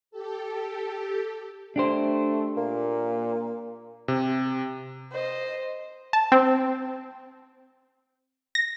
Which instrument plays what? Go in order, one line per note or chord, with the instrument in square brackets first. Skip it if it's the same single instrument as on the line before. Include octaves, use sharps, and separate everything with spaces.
[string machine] G4 A4
[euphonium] A3 [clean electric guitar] D4 G4 C5
[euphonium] A#2 [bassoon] A#3
[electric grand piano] C3
[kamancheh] C5 D#5
[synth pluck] A5
C4
A#6